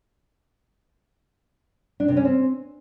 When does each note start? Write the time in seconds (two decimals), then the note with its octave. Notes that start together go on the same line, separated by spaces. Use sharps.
2.00 D4
2.08 C3
2.17 C#4
2.25 C4